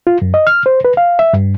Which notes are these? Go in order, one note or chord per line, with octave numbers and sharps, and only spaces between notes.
F4
F#2
D#5
F6
C5
B4
F5
E5
G2